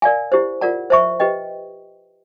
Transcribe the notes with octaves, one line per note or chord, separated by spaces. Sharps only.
A#4 D5 F5 G#5
E4 G4 C5
F4 A#4 D5 F#5 A5
C5 E5 A5 C#6
G4 B4 D#5 G5